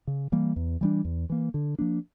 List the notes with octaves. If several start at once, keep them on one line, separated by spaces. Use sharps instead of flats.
C#3
E3 G3 A#3
E2
E3 G3 D4
E2
E3 A#3
D3
F3 A#3 D4